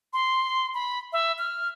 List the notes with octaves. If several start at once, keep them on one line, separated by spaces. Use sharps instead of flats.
C6
B5
E5
F6